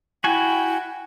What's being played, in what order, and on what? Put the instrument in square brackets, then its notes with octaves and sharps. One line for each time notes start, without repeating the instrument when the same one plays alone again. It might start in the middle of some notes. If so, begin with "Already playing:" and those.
[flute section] E4 G5 [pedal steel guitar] F#4 G#5